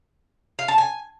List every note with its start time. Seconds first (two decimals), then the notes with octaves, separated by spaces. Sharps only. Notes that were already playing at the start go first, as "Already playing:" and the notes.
0.59 F5
0.68 A5
0.78 G#5